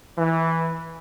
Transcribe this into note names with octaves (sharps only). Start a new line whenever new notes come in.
E3